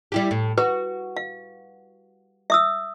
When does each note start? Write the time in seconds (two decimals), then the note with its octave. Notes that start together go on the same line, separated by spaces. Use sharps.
0.12 G3 E4 G4
0.31 A2
0.58 F#4 B4
1.17 F5
2.50 E5 D#6 E6